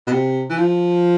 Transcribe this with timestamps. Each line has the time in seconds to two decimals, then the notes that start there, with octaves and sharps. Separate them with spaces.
0.07 B2
0.11 C3
0.50 E3
0.58 F3